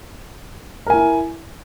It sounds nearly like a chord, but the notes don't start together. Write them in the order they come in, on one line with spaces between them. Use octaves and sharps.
A#4 G#5 E4